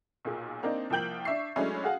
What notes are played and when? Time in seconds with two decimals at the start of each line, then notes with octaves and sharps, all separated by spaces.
0.25 B1 A#2 G#4
0.63 A#3 C4 D4 D#4
0.90 C2 F3 A#3 G5 G6 F#7
1.25 D4 E5 C#6 C7
1.56 F#3 G#3 A3 C#4 D4 E4
1.84 F#4 G#4 F5 F#5